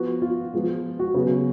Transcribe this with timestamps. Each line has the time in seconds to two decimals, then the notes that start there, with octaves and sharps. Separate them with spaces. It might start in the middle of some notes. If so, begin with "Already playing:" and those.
Already playing: F3 B3 F#4
0.22 F4
0.54 F3 G#3 B3
0.99 F#4
1.14 C#3 F#3 B3